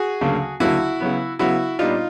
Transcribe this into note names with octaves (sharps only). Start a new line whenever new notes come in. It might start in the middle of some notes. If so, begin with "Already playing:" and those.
Already playing: F#4 G#4
D2 C#3 F#3 A#3
D2 C#3 F#3 A#3 E4 F#4
C#3 F#3 B3
C#3 F#3 B3 E4 F#4
A#2 G3 B3 D4 D#4 F4